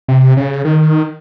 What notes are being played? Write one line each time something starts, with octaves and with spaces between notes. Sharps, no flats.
C3
C#3
D#3